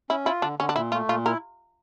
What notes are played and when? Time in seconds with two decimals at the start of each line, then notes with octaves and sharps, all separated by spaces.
0.10 C#4 E4
0.25 E4 F4
0.42 D3 D4
0.59 D3 C#4
0.69 D4
0.76 A#2 E4
0.92 A3 F4
1.08 A#2 F4
1.26 E4 A#4